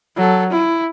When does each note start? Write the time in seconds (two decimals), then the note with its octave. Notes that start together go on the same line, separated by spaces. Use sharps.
0.16 F#3 A4
0.50 E4